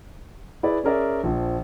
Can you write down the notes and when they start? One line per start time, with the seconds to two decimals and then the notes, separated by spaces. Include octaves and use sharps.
0.63 E4 G#4 B4 D5
0.84 C#4 G#4 A#4 D5 E5
1.23 A#1 F3